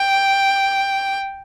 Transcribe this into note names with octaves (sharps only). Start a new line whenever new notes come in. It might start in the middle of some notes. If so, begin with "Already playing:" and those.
Already playing: G5